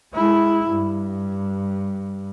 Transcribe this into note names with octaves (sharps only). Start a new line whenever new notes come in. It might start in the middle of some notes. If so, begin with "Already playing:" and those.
G#3 E4
G2